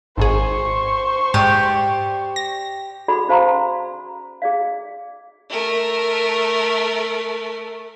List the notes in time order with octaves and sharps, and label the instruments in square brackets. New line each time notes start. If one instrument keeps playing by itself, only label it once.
[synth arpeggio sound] G#1 G#2 G#4 [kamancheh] C5 C#6
[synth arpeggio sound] G#2 D#7 [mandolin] G4 D5
[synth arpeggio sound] A#6
[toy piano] F#4 G#4 A4 D5 F#5 B5
C#4 C5 F5 A5 A#5 C6
G#4 D5 F5
[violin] A3 A#4